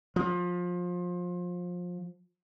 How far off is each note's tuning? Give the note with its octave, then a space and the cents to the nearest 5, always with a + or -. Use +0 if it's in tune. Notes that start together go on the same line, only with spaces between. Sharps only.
F3 +25